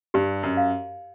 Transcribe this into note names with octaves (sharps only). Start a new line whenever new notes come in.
G2 G4
F#2
F5